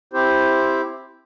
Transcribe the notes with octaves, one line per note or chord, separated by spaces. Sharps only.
C4 E4 G4 C5